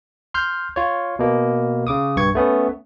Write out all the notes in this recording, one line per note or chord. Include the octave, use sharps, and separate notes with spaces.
C6 F6 G6
F4 C#5
B2 A#3
C#3 D6 D#6
B1 G2 C#6 G#6
A3 B3 C#4